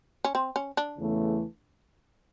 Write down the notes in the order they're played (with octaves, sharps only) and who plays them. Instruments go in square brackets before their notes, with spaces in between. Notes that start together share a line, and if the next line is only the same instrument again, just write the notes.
[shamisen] C#4
C4
C#4
D4
[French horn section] E2 C#3 E3 A3